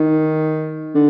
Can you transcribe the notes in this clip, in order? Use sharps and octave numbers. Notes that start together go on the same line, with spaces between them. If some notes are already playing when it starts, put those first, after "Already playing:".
Already playing: D#3
D3